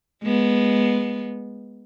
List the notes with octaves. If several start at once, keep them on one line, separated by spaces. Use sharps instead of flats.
G#3 B3